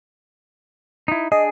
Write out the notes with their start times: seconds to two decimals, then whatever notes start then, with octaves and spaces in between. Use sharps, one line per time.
1.08 D#4 E4
1.32 D4 G#4 D#5